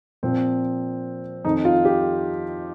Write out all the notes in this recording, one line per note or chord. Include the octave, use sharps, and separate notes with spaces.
A#2 F3 C4
F2 D#3 D#4
F4
G4